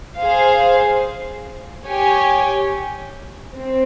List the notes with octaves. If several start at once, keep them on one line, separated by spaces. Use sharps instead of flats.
G#4 C5 F5
G4 C#5 G#5
C4